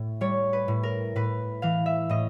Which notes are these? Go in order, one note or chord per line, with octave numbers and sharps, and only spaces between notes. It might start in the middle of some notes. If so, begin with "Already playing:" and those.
Already playing: A2
G3 C#5
B4
A2
A#4
A2 B4
E3 F5
E5
A2 D#5